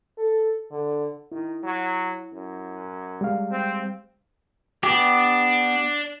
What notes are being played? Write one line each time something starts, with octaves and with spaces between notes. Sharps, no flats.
A4
D3
D#3 E4
F#3
F#2
G3 G#3 F5
C4
B3 D4 G4